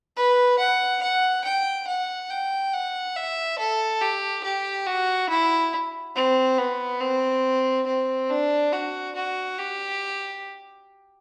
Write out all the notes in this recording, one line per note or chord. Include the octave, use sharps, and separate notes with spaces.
B4
F#5
F#5
G5
F#5
G5
F#5
E5
A4
G4
G4
F#4
E4
C4
B3
C4
C4
D4
F#4
F#4
G4